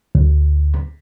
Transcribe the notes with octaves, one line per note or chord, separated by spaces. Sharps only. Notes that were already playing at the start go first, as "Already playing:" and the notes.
D2